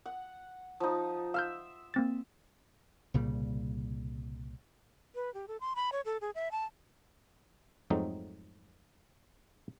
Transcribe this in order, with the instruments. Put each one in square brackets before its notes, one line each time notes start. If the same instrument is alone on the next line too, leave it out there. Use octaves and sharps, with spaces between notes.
[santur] F#5
F3 D#4
[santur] E5 C6 [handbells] F5 F6 G6
[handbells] A#3 C4 A6
[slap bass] C2 A#2 C#3 G3
[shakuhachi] B4
G4
A4
C6
B5
C#5
A4
G#4
E5
A5
[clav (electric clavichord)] F2 G#2 F#3 A3 C4 D#4